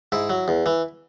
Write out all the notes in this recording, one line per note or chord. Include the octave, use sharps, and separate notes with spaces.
G#2 E4
F#3
E2
E3